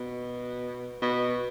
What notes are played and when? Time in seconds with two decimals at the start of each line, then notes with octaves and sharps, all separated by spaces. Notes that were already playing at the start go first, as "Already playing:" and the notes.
Already playing: B2
1.02 B2